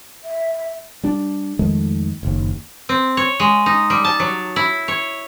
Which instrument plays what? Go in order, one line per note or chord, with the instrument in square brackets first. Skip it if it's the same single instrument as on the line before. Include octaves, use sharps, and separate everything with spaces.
[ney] E5
[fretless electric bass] G3 D4
F2 D#3 G#3 A3
F#1 D#2
[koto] C4
C#5
G#3
D#4
G3
A5
F#3
E4
C#5